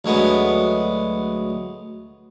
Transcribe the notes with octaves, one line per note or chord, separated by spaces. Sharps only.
D2 F#3 G#3 B3